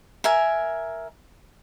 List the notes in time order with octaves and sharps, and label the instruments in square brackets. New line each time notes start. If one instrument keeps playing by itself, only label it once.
[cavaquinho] A#4 E5 G#5